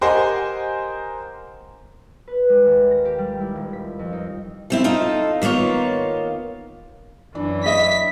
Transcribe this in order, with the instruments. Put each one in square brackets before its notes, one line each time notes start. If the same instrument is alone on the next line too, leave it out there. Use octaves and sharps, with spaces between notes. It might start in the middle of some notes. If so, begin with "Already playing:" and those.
[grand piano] G4 A#4 C5 D#5 F#5 G#5
[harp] B4
G#3
D#2
A#6
G4
G3
E4
D#1
B6
F2
D#4
[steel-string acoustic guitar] F3 C4 E4
D#4 F4 A4
D#3 A#3 B3 F4 C#5
[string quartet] F#2 E3 [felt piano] D4
[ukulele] D#5 E5 [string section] B6